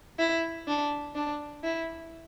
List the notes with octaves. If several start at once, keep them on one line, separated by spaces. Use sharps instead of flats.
E4
D4
D4
E4